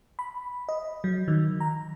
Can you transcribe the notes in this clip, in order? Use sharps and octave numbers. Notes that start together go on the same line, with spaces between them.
B5
D#5
F#3
D#3
A#5